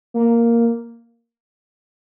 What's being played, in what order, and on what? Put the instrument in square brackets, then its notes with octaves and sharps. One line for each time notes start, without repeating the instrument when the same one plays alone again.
[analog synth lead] A#3